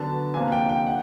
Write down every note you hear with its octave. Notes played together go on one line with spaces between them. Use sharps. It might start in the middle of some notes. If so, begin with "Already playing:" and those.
Already playing: D3 F#3 B3 A5
C3 F3 A#3 D4 G#5
G5
G5
F#5